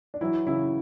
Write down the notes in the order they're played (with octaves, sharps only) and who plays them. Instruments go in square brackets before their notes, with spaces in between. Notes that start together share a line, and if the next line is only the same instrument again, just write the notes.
[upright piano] D4
[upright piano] E3 E4 [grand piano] F#3
[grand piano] C#3 [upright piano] E3 E4